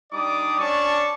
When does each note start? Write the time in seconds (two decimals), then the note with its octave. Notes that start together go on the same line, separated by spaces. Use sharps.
0.12 G3 D4 D#4 D5 D6 D#6
0.60 C#4 D4 D5 A5 C#6